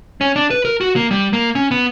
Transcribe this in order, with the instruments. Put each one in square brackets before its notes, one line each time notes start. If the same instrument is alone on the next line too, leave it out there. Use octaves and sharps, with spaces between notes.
[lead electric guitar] C#4
D4
B4
A#4
F#4
A#3
G3
A#3
C#4
B3